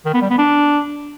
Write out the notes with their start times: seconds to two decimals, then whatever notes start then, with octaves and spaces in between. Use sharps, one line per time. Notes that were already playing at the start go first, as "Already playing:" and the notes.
0.05 D#3
0.14 B3
0.22 G3
0.30 B3
0.38 D4